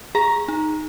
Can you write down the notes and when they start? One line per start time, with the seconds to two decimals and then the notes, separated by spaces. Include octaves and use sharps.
0.15 G#4 A#5
0.48 D#4